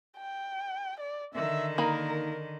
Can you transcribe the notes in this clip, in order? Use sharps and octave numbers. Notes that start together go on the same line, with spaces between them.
G5
D5
D3 D#3 E5
A#3 D#4 A#4 B5